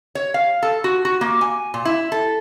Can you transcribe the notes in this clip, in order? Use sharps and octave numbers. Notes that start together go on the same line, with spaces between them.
C#5
F5
A4
F#4
F#4
A#3
G#5
A#2
E4
A4